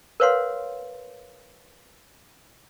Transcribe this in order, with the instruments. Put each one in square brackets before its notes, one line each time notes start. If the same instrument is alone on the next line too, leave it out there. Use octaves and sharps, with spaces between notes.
[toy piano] A#4 B4 C#5 F5 F#5 C6